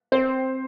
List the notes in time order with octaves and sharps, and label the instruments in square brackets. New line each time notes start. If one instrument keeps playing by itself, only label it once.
[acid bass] C4 [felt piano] C5